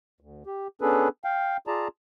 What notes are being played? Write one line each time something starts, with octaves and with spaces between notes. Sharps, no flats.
D2
G4
B3 C#4 D4 G#4 A4 B4
F5 G5
F4 G#4 D5 A5 A#5